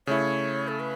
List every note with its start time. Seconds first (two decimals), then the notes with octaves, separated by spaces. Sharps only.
0.07 C#3 A3 E4 C#5
0.68 A4
0.80 B4